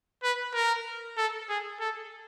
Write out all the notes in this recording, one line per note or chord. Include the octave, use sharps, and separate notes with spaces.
B4
A#4
A4
G#4
A4